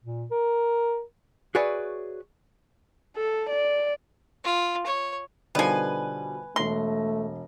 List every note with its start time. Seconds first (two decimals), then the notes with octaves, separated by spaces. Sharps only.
0.04 A#2
0.31 A#4
1.55 F#4 G#4 B4 C#5 D5 E5
3.16 A4
3.50 D5
4.44 F4
4.86 C#5
5.55 B2 D3 D#3 F3 G3 B4 G#5
6.56 E1 A3 C6 A#6